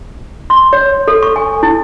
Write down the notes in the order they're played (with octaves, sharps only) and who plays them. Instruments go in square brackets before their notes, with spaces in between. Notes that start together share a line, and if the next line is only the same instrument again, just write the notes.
[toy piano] C6
C#5
A4
C#6
G#5
E4